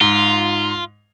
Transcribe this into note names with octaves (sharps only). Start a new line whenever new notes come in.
G#2 F4